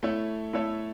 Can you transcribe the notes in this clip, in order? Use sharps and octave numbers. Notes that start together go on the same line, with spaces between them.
A3 E4 A4 C#5 E5
A3 E4 A4 C#5 E5